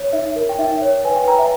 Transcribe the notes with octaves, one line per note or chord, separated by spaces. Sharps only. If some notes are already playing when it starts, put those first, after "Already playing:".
Already playing: C#5
D#4 E5
A#4
G5
D#4 E5
C#5
B4 G#5
G5
B4 A#5
E5